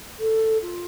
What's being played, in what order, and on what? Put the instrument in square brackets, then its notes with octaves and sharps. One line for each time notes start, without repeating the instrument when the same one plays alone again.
[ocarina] A4
F4